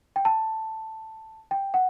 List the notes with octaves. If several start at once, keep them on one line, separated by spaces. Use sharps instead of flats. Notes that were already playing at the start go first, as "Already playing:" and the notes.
G5
A5
G5
F#5